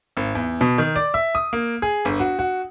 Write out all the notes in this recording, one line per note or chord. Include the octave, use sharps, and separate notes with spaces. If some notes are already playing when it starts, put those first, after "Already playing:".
G#1
E2
B2
D#3
D5
E5
D#6
A#3
G#4
G1
F#4
F#4